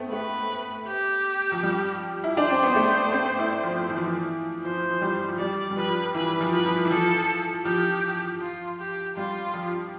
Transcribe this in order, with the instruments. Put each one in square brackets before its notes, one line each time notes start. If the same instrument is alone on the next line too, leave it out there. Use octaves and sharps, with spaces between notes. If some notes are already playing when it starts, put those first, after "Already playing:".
Already playing: [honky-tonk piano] A3 B3 C4
[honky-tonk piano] A3 [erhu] B4
[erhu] G4
[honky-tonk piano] F3
G3
E4
[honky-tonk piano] D4 [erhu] C5
[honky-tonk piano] C4
B3
A3
C4
E4
F3
E3
F3
E3
[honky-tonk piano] F3 [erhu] C5
[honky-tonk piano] F3
G3
F3
[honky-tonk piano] G3 [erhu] D5
[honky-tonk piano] G3
[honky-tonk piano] F3 [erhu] B4
[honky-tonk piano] E3 [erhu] B4
[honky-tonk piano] F3
[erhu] B4
[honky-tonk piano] F3
E3
[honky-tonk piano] F3 [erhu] A4
[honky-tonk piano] F3 [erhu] G4
[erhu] F4
G4
[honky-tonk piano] G3 [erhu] F4
[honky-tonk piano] F3